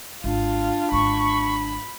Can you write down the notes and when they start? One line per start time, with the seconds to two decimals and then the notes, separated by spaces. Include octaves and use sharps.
0.24 G#1 D4 F4
0.92 G#1 D3 B5 C#6